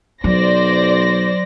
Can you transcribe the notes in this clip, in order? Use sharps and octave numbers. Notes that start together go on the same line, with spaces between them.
B1 F#3 C5 D5 A#6